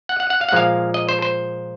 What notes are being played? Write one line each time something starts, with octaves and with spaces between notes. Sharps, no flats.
F#5
F#5
F#5
F5
F#5
A#2 F3 G#3 F5
D#5
C5
C5